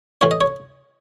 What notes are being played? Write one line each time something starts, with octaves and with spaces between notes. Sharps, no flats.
A2 E3 C#5
D#5
C#5